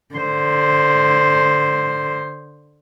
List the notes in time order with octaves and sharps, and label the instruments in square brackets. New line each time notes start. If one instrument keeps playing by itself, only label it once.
[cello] D3 C5